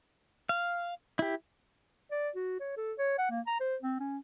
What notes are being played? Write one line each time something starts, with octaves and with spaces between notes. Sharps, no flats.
F5
E4 G4
D5
F#4
C#5
A4
C#5
F#5
A#3
A#5
C5
C4
C#4